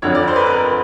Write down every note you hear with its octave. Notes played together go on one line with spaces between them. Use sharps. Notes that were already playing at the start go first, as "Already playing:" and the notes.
F2 D3 F3 C#5
D5
C5
B4
A#4
B4
A#4